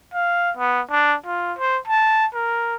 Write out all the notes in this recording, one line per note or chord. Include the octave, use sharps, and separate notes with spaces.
F5
B3
D4
F4
C5
A5
A#4